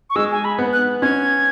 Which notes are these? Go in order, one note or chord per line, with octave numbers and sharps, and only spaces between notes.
C#6
G#3 E6
G#5
B5
B3
F#6
C#4 G#6